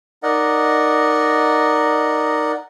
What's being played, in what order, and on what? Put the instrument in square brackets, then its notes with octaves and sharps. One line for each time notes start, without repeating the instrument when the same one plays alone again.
[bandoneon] D#4 A#4 D5 D#5 F#5